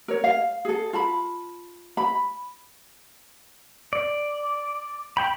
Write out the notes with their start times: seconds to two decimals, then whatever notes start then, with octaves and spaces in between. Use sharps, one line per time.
0.08 A#4 C#5
0.24 F5
0.65 G#4 A4
0.93 F4 A5 B5
1.97 B5
3.93 D5
5.17 G5 B5